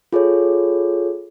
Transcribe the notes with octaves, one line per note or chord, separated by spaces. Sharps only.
F4 G#4 A4 C#5